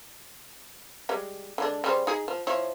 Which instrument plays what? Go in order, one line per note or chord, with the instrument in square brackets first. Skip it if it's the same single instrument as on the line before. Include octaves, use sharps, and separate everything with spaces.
[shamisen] G3 G#3
D3 G#3 D4
C#3 G3 C5
D#4 G#4
F3
F3 E4 C#5